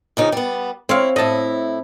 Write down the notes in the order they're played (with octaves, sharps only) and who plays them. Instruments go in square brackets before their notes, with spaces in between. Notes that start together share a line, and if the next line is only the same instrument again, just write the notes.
[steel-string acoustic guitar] F2 C#3 D#4
G3 B3
[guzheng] C4 C#5 F5 [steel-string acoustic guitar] E4
[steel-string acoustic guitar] A2 E4 [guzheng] D#5 A5